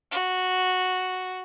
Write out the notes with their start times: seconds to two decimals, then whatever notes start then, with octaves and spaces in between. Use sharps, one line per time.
0.12 F#4